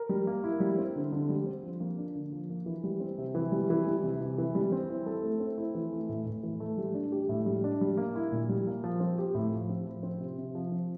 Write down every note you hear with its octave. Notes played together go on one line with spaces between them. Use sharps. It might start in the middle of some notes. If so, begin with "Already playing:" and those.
Already playing: A#4
G3
A#3
E4
G3
C4
D3
D3
G3
C4
F3
A#3
D4
D3
F3
A#3
E3
G3
C4
C3
E3
G3
E3
G3
C3
C3
E3
G3
C4
E4
A4
A3
C4
E4
E3
A3
A2
A2
E3
A3
G3
D4
G4
A2
G3
D4
G3
A#3
E4
A#2
G3
A#3
F3
C4
G4
A2
F3
C4
F3
C4
C3
C3
F3
C4